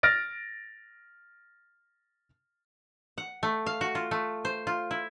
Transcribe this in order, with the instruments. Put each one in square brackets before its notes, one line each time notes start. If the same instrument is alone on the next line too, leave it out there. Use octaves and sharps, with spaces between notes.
[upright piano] F6 A6 A#6 D7
[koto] F#5
A3
F5
F#4
F4
A3
C5
F4
E4